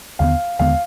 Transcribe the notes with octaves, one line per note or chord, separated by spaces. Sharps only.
D#2 D3 G#3 B3 F5
D#2 D3 G#3 B3 F5